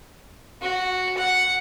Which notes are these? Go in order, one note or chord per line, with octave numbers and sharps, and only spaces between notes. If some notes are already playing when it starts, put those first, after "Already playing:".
F#4
F#5